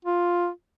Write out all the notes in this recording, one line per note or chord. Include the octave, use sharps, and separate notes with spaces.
F4